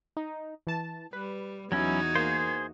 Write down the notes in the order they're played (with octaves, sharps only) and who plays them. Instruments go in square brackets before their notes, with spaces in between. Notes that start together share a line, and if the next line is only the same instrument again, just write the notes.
[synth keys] D#4
E3 A5
[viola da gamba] G3 [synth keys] B4
[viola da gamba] E2 D#4 F#4 [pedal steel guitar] F#3 C#4 E4 [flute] G#6
[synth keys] A#3 [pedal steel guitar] G#4 C5